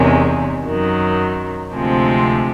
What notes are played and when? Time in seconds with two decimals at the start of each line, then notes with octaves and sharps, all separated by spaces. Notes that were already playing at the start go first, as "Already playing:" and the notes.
Already playing: E2 C3 D#3 G#3 C#4
0.65 F#2 D#3 F#3
1.73 D2 C3 F3 G#3 C4